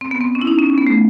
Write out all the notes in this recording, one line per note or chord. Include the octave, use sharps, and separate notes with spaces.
C4
B3
C4
C#4
E4
D#4
C#4
C#4
B3
A3